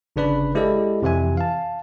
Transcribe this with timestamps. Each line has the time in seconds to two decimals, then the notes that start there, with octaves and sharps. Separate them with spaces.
0.16 G1 C#3 D4 B4 D5 B5
0.55 G#3 E4 G4 A4 D5 D#5
1.02 F2 C3 E3 E5 G#5
1.37 F5 A5